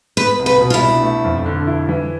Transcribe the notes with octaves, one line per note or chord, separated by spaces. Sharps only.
B3 B4
C2
B4
B2
F4
E4
D4
A3
F2
D3
E4
E3